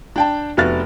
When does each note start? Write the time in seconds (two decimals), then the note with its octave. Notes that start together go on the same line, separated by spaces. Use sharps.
0.16 D4 G5 A5
0.57 F1 B3 F#4 E5 F6 A6